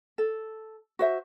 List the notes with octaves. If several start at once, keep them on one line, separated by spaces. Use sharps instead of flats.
A4
F#4 C5 E5